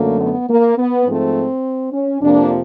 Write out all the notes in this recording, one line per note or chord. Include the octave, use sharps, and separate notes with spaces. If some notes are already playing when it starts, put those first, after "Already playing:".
Already playing: F#2 D3 F#3 A3 A#3
B3
A#3
B3
G#2 F3 A3 C4
C#4
F2 C3 F3 A#3 D4